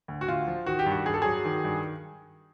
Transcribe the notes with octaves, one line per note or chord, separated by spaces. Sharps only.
D2
F#4
D2 F4
F3
D#3 F#4
G4
G2
F#4
G2 G#4
A4
F#3 G#4
D#3
G2